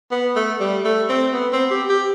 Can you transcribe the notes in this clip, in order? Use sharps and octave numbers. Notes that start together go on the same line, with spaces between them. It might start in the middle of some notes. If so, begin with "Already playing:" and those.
B3
A3
G3
A3
C4
B3
C4
G4
G4